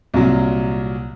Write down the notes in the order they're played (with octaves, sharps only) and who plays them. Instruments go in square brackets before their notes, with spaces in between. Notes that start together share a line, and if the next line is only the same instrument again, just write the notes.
[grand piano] C2 A#2 F#3